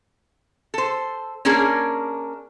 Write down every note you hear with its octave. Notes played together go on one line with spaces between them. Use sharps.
A4 C5
A#3 C#4 D4 G#4 A#4